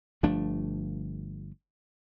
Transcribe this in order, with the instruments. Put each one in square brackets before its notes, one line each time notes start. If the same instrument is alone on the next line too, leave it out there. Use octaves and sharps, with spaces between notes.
[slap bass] G1 F3 A3 D4